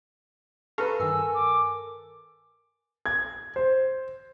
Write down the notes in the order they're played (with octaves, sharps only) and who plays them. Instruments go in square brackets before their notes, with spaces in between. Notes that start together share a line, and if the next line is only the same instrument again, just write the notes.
[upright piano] A4 B4 [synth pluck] F5 A#5 C#6
[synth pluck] G2 D#3 [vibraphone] A#4 G#5 [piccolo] E6
[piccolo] D6
[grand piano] G#6
C5